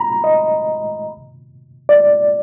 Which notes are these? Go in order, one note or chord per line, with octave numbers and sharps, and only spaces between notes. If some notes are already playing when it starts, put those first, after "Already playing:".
Already playing: A#5 B5
D#5
D5